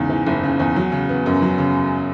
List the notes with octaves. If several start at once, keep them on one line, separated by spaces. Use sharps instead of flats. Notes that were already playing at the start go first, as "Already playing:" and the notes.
Already playing: E2 G#2 C#3
E3
F#1
C#3
E2
F#3
C#3
B3
F#2
F#3
C#3